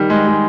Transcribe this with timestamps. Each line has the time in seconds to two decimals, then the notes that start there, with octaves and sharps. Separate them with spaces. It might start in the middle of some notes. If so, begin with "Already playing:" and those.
Already playing: D#3 G3
0.10 G#3
0.27 G#3